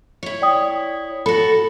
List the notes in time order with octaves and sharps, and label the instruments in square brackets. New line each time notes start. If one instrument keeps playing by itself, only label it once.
[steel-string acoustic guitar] E4 C#5
[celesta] D5 G5 D#6
[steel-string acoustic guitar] F#4 A4 [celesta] B5